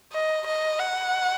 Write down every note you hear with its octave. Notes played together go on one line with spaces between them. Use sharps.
D#5
D#5
F#5